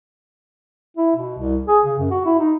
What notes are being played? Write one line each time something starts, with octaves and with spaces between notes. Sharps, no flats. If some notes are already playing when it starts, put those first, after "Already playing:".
E4
B2
C2
G#4
C#3
F#2
F#4
E4
D#4